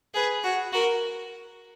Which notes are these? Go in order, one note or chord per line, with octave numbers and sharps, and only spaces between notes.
G#4 B4
F#4
F#4 A#4